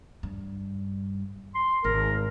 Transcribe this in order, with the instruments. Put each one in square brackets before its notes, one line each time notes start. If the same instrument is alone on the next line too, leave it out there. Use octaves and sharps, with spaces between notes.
[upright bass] G2
[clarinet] C6
[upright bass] G#1 [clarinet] A#4